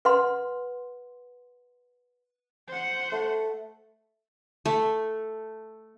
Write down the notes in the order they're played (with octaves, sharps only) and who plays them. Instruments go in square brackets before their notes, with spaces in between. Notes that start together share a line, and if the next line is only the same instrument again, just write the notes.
[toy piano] B4 F#5 C6
[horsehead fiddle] C5 F#5
[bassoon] A3
[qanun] A3